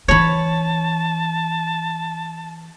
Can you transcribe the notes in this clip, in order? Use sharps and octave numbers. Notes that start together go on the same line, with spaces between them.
E3 D4 C#5 A5 B5